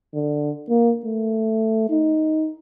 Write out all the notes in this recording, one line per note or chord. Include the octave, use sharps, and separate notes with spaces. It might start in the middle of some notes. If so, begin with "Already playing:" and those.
D3
A#3
A3
D#4